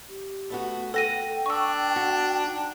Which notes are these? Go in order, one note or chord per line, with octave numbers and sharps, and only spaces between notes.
G4
A3 B3 F#4
A4 F#5 G5 A#6 D#7
D4 C#6 E6
F#4
D#4